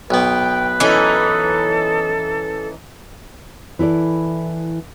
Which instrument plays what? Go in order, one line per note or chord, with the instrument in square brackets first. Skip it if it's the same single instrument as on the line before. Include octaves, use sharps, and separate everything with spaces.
[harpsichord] B1 B3 [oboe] B4 [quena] G5
[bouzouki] E3 C#4 D#4 [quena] A4
[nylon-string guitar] E3 E4 A4 D5